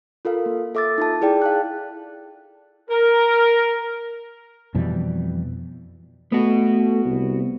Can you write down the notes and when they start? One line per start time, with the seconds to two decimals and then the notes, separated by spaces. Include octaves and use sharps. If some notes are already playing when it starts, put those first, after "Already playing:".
0.25 F4 A4 A#4 F5
0.46 A#3
0.75 A4 E5 D6 E6 A6
0.98 D#4 F4 A5
1.21 E4 G#4 D5 G5
1.42 F5 A5 F#6
2.89 A#4
4.75 F2 B2 E3 G3
6.32 A3 B3 F#4
7.05 C2